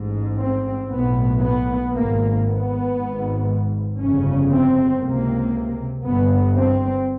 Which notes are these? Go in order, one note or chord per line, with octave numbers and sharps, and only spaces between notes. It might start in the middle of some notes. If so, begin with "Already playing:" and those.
Already playing: A1 G#2
C4
B1 A2 B3
B3
G#1 G#2 A#3
B3
G#1 G#2
G1 F2 C#3 C#4
C4
C#2 C3 A#3
G1 G2 B3
C4